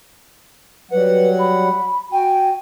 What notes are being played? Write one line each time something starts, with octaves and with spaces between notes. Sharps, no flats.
F#3 G3 B4 F#5
B5
F#4 G5 G#5